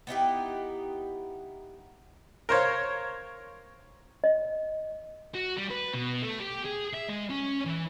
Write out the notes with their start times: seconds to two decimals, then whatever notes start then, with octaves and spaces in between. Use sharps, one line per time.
0.07 B3 D#4 E4 G4
2.49 A#4 C5 C#5 F5
4.24 D#5
5.34 F#4
5.57 G3
5.70 B4
5.94 B2
6.22 A3
6.40 G4
6.65 G#4
6.93 E5
7.09 G#3
7.30 C#4
7.65 E3